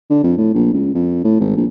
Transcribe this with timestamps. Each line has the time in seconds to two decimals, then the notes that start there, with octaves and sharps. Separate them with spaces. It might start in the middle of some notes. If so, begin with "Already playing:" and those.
0.10 D3
0.23 F2
0.37 A2
0.54 A#1
0.73 C#2
0.95 F2
1.24 A2
1.40 G#1
1.56 A#1